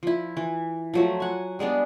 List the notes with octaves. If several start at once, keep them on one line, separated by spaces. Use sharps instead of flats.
F3 E4
E3
F3 F#3 A3
F#5 G#5
G3 G#3 B3 D4